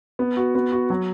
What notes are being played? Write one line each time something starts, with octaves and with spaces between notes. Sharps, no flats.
B3
F#4
B3
F#4
F#3